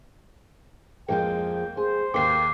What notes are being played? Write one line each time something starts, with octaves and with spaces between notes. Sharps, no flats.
F2 F3 G#3 A#3 G5
G#4 C5
D#2 A#3 G5 D6 C7